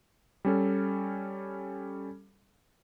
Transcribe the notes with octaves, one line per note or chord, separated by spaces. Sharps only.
G3 C#4 A4